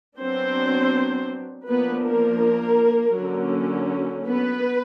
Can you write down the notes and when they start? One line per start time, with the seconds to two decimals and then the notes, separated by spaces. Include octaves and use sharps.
0.20 F#3 B3 C4 D4 C5
1.68 F3 A#3 B3 D4 B4
2.04 A#3 A#4
3.16 D3 F#3 A#3 C#4
4.26 B3 B4